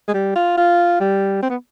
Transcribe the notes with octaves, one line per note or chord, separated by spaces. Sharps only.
G#3
G3
F4
F4
G3
C4
B3